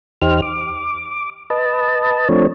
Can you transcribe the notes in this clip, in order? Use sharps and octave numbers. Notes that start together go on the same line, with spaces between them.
E2 D#4 G4 C5 F6
D6
B4 D#5 A5
F3 A3 C4 D4 C#5